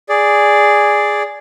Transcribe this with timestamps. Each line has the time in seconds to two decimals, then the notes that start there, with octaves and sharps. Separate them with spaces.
0.09 G#4 D5